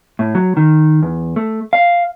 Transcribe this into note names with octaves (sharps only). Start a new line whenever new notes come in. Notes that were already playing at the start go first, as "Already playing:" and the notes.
A2
F#3
D#3
E2
A3
F5